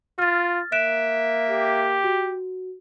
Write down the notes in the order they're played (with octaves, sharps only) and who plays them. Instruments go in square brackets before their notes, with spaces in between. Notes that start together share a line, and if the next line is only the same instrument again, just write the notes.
[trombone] F4 [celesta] F6 A6
[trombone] A#3 [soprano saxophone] E5 [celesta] F#6 D7 E7
[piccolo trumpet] G4
[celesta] F#4